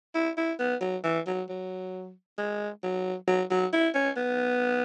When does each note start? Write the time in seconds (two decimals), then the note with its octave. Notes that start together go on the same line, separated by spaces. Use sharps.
0.15 E4
0.37 E4
0.60 B3
0.81 F#3
1.04 E3
1.27 F#3
1.49 F#3
2.38 G#3
2.83 F#3
3.28 F#3
3.51 F#3
3.73 E4
3.94 C#4
4.17 B3